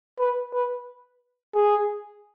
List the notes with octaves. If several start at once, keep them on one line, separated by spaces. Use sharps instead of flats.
B4
B4
G#4